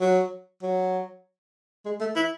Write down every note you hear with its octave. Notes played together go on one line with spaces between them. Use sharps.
F#3
F#3
G#3
A3
E4